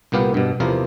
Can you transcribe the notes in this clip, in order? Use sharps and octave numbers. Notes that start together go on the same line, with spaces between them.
C2 A#2 B3 G4 F5
G2 B2
E2 C3 F3 A#4 D5